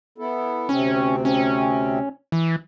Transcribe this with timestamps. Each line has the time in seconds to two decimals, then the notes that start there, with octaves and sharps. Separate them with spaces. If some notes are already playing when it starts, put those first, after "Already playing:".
0.18 B3 E4 A4
0.69 D2 C3 C4 C#4
1.25 C#4
2.32 E3